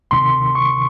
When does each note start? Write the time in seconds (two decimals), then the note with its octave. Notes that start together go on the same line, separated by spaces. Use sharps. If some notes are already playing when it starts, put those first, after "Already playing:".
0.11 C#2 C3 D#3 C6
0.55 C#6